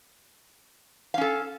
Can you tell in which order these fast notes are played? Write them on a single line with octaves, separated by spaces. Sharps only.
F5 C#4 A4